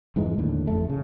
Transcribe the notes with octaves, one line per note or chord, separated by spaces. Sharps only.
F2 G#2 E3 G#3
D#2 A2 D3
A1 F2 A3
C#3